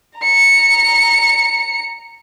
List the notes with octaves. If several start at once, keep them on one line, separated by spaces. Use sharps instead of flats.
A#5 C#7